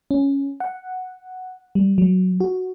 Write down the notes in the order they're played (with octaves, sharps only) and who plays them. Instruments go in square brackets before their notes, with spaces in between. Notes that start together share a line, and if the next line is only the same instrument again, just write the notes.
[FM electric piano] C#4
F#5
G3
F#3
F#4